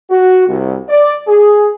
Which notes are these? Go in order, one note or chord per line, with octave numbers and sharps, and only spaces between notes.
F#4
C2
D5
G#4